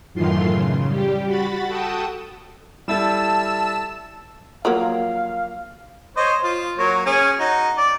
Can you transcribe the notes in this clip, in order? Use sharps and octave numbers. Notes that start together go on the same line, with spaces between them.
F#2 A2 D#3 E3 F4 C6
C#3
G3 G4
F#4 B5 A6
F#4 A4 G5 A5 D#6
G3 E4 A4 A5 E6 E7
F3 F#3 A#3 F5
C5 C#5 D#5
F4
F#3 A#3 C#5
C#4 G#4
D#4 F#4
D5